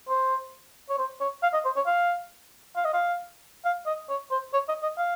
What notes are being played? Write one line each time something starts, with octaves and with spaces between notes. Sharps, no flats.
C5
C#5
C5
C#5
F5
D#5
C5
C#5
F5
F5
D#5
F5
F5
D#5
C#5
C5
C#5
D#5
D#5
F5